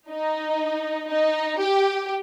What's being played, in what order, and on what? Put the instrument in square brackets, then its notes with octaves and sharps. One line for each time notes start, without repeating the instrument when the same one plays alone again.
[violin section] D#4
D#4
G4